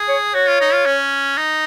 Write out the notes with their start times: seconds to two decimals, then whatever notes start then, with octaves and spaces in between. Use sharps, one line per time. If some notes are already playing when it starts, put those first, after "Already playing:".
Already playing: G#4
0.09 C#5
0.34 F#4 C#5
0.47 F4
0.61 D#4
0.73 F4
0.86 C#4
1.37 D#4